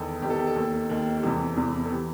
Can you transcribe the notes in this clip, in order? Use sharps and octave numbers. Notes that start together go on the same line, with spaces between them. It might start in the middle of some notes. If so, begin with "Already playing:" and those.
Already playing: E2 D#3 A4
E2 D#3 G4 A4
G4
A4
D#2 D#3
D#2 D#3
G4
E2 C3 E3 A4
E2 C3 E3
A4
E3 G4